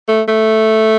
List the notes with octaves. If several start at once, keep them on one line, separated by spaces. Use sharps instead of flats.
A3
A3